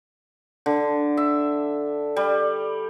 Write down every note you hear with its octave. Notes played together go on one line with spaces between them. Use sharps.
D3
E5
G3